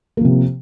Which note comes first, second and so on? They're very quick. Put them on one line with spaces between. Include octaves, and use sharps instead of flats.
A#3 F3 C3